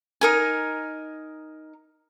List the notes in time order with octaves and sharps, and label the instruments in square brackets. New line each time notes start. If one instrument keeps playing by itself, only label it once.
[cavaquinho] D#4 A#4 G#5